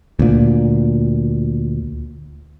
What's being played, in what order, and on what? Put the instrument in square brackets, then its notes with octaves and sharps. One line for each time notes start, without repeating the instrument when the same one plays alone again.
[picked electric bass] D2 A#2